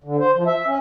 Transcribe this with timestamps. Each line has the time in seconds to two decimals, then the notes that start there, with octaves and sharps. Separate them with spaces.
0.04 D3
0.19 C5
0.35 F3
0.46 E5
0.67 C#4